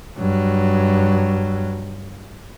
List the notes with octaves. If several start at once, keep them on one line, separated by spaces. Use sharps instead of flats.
G2 F#3